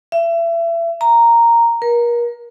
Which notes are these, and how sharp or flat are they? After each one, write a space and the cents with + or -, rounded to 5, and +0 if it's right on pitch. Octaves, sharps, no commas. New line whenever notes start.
E5 +30
A#5 -5
A#4 +35